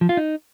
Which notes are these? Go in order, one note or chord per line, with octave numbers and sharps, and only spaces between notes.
F3
F4
D#4